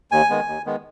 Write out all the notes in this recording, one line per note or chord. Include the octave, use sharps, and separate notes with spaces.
D#2 G#5
D#3 G#3 B3
D#2
D#3 G#3 B3